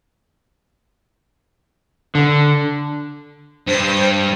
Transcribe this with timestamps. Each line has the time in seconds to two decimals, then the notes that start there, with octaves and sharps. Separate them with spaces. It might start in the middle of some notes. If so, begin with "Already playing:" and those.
2.15 D3
3.67 G2 C5